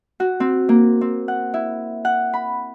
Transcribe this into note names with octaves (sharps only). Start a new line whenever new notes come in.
F#4
C4
A#3
C4
F#5
E4
F#5
B5